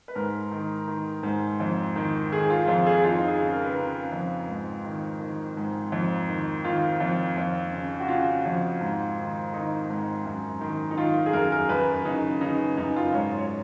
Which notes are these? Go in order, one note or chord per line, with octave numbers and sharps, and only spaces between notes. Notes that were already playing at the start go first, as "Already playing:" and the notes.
B4
G#2 A#4
D#3
D#3
G#2
F2
D#3
D#3 G#4
F4
F2 F4
G#4
F2 F4
D#4
F4
G#4
C#3
A#4
B4
C#3 A#4
F2
G#2
D#3
D#3
G#2
F2
D#3
D#3 F4
F2
F2
C#3
F#4
C#3 F4
F2
G#2
D#3
D#3 D#4
G#2
F#2
D#3
D#4
D#3 F4
G#4
F#2 A#4
A#4
F#2 B4
C#3 D#4
C#3 D#4
F#2 D#4
F4
G#2 C#5
C#5